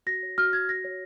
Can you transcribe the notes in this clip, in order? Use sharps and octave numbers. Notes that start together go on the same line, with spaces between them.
F#4 A#6
C#5
F#4 F6
F#4 G#6
F#4 A#6
C#5